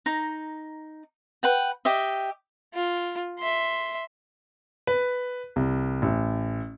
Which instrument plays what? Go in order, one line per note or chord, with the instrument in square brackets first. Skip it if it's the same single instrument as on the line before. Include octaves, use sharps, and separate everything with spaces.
[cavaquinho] D#4 A#5
B4 F#5 G5
G4 D#5 E5
[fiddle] F4
E5 C6
[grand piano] B4
C2
A1